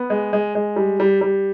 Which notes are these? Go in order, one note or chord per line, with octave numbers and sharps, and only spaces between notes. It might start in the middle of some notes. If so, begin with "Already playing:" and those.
Already playing: B3
G#3
G#3
G#3
G3
G3
G3